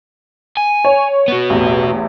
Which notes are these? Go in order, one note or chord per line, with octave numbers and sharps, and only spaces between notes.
G#5
C#5
B3 F#4
A1 E2